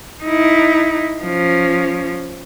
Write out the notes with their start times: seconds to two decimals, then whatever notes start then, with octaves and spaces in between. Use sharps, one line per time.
0.24 D#4 E4
1.22 F3 C#4